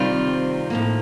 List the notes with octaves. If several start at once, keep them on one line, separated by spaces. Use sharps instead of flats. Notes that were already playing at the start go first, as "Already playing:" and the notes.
Already playing: C3 D#3 G3 C4 F4
A2 F3 A#3